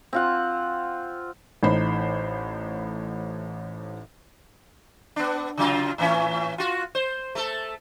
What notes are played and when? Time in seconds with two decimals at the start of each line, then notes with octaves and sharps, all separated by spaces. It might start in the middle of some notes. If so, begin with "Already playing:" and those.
0.13 C4 F4 F#5
1.63 A1 A2 D#4 C5 B5
5.16 B3 D4
5.57 C#3 F#3 F4
5.98 A2 E3 C#4
6.58 F4 F#4
6.95 C5
7.35 A3 A4